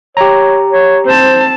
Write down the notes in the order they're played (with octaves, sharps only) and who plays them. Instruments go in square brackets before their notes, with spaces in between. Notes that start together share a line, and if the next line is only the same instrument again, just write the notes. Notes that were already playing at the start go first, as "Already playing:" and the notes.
[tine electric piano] G4 A#5 [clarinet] C#5
[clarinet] C#5
[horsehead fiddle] C4 A5 [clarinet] C5